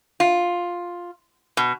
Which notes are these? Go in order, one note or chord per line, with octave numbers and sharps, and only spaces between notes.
F4
B2